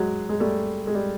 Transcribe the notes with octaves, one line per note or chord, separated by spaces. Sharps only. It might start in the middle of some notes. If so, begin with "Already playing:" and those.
Already playing: F#3 G#3
G#3
G3 A3
G#3
G3